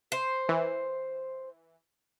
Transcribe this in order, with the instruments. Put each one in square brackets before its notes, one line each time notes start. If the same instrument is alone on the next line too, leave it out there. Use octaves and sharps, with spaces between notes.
[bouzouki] C5
[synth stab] E3